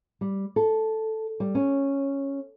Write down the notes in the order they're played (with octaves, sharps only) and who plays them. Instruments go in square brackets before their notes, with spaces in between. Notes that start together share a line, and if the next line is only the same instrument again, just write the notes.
[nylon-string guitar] G3
A4
G3
C#4